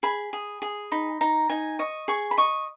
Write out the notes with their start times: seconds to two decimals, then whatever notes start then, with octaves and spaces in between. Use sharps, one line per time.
0.03 G#4 B5
0.33 G#4
0.62 G#4
0.92 D#4 B5
1.21 D#4 A#5
1.49 D#4 G#5
1.79 D#5 C#6
2.08 G#4 C#6
2.31 B5
2.37 D#5 C#6